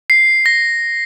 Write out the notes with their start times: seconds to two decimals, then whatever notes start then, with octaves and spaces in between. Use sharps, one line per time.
0.10 C7
0.46 A#6